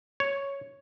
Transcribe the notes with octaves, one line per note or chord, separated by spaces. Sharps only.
C#5